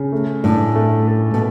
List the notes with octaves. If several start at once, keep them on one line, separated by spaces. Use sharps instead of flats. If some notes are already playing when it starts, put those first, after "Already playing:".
Already playing: C#3
A3
A2 D4
A3
A4
B2